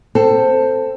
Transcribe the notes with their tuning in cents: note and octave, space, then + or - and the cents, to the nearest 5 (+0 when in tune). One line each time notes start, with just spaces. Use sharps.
C4 +0 A4 +15